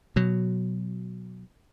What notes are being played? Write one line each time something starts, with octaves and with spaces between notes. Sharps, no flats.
B2 F#3